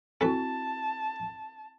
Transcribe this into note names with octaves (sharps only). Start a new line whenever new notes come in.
C4 E4 F#4 A4 B4 A5